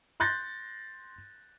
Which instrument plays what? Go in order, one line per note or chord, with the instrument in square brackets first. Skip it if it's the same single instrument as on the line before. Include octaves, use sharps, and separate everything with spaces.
[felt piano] C6 F#6 G6 A6 A#6